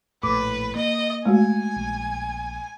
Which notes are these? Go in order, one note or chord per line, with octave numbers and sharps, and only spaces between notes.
A#1 A2 B4 D6
A#3 D#5
G#3 A3 F#4 G#5
A#1